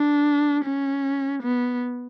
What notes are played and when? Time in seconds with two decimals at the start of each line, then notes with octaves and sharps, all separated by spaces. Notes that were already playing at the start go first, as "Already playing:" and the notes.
Already playing: D4
0.65 C#4
1.43 B3